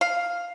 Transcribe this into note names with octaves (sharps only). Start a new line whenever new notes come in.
F5